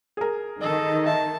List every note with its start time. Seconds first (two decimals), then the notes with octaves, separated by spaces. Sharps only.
0.17 G#4 A#4
0.61 D#3 A4 D#5
1.06 E5 A5